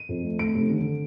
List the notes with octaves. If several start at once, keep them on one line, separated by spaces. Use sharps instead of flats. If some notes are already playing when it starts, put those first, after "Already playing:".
Already playing: D#7
F2
A3
A3 D7
F1
D3